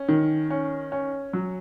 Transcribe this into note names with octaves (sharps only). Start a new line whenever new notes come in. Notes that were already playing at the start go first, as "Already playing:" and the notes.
Already playing: C#4
D#3
C#4
C#4
F#3